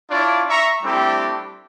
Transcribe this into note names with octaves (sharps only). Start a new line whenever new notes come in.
D4 E4 F4 C#5 D5
E5 A#5 C#6
G3 A3 C4 D4 E4 G4